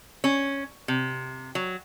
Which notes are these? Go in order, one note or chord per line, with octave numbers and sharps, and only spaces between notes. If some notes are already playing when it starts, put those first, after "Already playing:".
C#4
C3
F#3